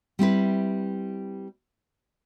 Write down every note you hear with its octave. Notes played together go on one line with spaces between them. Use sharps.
G3 C4 E4 B4